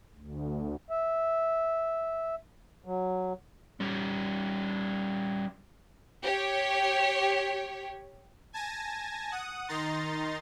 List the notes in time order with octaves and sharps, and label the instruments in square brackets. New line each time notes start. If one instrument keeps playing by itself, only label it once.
[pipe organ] D2
[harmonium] E5
F#3
[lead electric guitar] G3 C#4
[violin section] G4 C#5
[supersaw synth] G#5 A5 G#6 A#6
F#5 D#6
D#3 D#4 A#5 C6 A6